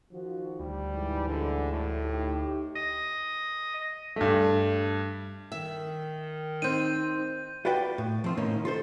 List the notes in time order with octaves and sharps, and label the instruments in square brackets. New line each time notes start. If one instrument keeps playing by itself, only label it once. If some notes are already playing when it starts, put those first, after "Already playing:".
[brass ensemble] D#3 F3 F#4
[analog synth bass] D2 [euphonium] G3
[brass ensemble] G#2 E3
[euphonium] D3
A2
[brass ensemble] D#4 G4
[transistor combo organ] D#5
[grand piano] G2 A3
[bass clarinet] D#3 [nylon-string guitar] E5
[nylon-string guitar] C4 D#4 [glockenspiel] G6 D#7
[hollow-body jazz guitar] F4 F#4 B4 D5 G5
A2
F3 C4 F4
A2 D#3 A#3 C#4 D#4
F4 A4 C5